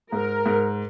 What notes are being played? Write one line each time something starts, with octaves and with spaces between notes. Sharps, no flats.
G#2 A#4
G#2